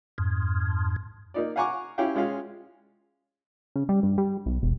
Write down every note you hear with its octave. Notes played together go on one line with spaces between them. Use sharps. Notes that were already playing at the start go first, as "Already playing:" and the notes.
F2 G#2
A#3 D#4 D5
F5 F#5 G#5 A#5 C#6 D6
C#4 E4 G4 C#5 F5 G5
G#3 C#4 F4 F5
C#3
G3
G2
G3
B1
E1